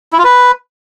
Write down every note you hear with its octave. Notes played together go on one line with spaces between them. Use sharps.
E4
F4
B4